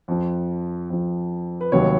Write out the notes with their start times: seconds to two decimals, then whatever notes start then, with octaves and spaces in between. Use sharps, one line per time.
0.08 F2 F3
0.90 F2 F3
1.61 B4
1.72 F1 D#2 D#3 F#3 C#5